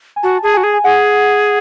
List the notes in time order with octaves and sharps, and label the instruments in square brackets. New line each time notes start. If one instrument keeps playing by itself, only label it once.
[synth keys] G#5
[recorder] F#4 [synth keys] A5
[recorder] G#4 [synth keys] A5
[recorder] F#4 [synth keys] G#5
[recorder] G#4
[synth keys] G#5
[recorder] G#4 [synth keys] F#5